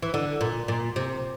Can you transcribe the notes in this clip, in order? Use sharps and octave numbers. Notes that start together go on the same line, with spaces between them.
E3
D3
A#2
A#2
C3